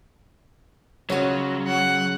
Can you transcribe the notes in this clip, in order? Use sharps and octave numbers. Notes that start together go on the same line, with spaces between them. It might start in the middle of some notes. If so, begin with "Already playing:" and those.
C#3 F#3 F4 F#4 C#5 D#5
F#5